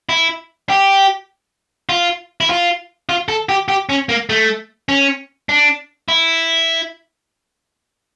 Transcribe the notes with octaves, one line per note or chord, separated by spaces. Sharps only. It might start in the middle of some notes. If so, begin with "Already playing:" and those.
E4
G4
F4
E4
F4
F4
A4
G4
G4
C#4
A#3
A3
C#4
D4
E4